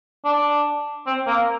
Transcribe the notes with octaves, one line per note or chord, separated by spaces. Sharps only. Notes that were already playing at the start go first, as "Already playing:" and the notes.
D4
C4
A#3